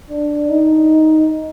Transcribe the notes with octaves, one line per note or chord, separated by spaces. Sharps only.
D4
D#4